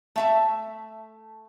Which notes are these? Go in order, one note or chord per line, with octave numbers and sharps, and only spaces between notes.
A3 E5 A5